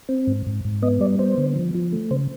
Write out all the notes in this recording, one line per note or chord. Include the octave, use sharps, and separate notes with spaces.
C4
G#2
G#2
G#2
B3 D#5
G3 D5
B3 C5
D3
F3
F3
A3
C#3 C5